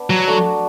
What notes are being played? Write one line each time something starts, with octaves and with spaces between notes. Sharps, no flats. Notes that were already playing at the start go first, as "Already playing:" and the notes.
Already playing: B3 D4 B4
F#3
A3 D4 F#4 D5